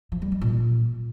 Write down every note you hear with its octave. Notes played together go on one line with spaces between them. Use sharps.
F3
G3
G#3
A#2